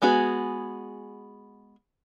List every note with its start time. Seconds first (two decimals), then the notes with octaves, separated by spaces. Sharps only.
0.02 G#3 B3 F#4 G#4